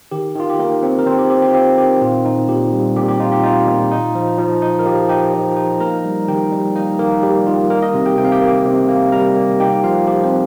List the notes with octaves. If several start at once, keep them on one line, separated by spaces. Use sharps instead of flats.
D#3 G4
D#3 F4
G4
D#3 A#3 A#4
C4
A#4
D#3 C4 C5
G4
C4 G4
G4
F4
C4 G4
D#3 G4
A#2 F4
D#4
A#2 G4
G3
A#2 G4
G4
D#4 F4
G4
D#4 F4
A#2
D#4
F3
F3
D#4
A#4
F3 G4
D#4 G4 G5
F3
D#4
A#3 A#4 A#5
G3
D#3 G4 G5
G3
A#3 D#4 D#5
D#3 A#3 A#4
G3 G4
D#3 F4
A#3 A#4
D#4 D#5
C3
G4 G5
C3 G5
F5
G4 G5
A#3
C3
A#3
G3 A#4 A#5
A#3
D#4 G4 G5
F3 F4 F5
F3 G4
C4 C5